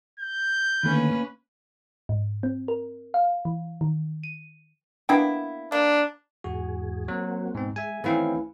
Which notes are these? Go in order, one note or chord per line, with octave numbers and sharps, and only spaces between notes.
G6
D3 D#3 A3 A#3 C#4 B4
G#2
C4
A#4
F5
E3
D#3
D#7
A#3 B3 D4 E4 G5
A#3 D4
E2 G#2 F#4 G#4
F#3 A#3 C4 F#4
G#2 B2 C4
G#3 E5 G#5
D#3 E3 A3 C4 C#4 F5 G#5